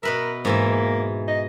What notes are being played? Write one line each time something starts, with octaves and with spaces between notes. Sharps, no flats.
B2 A#4 B4 E5
G#2 E3 A#3 E5
D#5